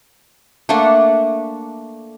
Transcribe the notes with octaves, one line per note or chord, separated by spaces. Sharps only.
A3 A#3 D4 F#5